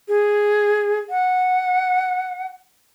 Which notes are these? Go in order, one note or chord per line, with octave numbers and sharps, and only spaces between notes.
G#4
F#5